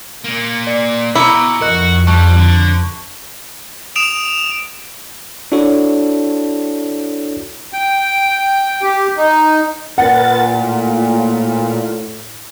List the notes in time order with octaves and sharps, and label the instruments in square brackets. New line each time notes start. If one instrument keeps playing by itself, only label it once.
[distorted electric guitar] A#2 A#3
[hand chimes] D5 C7
[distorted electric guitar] B2 [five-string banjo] E4 [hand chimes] A#5 D6
[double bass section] F2 [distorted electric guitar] F#4 [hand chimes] A#4 D#5 F#6
[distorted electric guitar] G3 [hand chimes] A5 C#6 F#6
[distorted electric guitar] D3
[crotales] D#6 D7 E7 F7
[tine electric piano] D4 E4 F#4 A4 C#5
[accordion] G5
G4
D#4
[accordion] A#2 [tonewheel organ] A#4 B4 A6 [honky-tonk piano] F#5
[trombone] A2 [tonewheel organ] F4